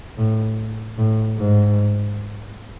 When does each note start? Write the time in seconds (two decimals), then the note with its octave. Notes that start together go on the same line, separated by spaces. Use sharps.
0.18 A2
0.98 A2
1.38 G#2